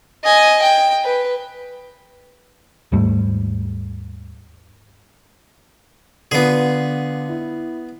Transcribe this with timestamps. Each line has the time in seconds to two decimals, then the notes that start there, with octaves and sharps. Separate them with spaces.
0.25 D#5 G#5
0.62 G5
1.04 B4
2.92 D#2 G#2 G3 A3
6.31 D3 B3 F4 G#4
7.28 E4